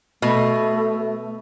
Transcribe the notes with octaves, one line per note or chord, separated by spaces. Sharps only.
B2 A3